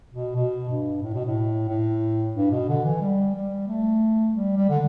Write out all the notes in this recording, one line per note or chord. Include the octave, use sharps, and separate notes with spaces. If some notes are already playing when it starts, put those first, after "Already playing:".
B2
B2
G2
A2
B2
A2
A2
G2
B2
D3
E3
G3
G3
A3
G3
G3
D3